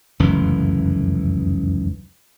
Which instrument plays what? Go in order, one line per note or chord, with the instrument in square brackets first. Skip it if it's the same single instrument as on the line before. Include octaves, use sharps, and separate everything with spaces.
[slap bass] F1 C#2 F#2 E3